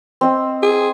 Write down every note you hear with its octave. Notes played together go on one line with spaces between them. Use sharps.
C4 D#5 E6
G#4